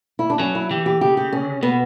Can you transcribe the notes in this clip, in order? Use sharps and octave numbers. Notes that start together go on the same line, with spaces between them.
E4
D4
F#3 C#4
E4
E3 G4
G4
C#3 G4
G4
C#4
B2 B3